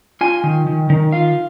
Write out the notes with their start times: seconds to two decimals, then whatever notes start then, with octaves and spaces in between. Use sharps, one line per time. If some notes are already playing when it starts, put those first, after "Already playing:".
0.21 F4 G#5
0.44 D#3
0.67 D#3
0.90 D#3
1.12 F4 F5